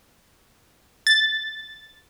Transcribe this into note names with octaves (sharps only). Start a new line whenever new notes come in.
A6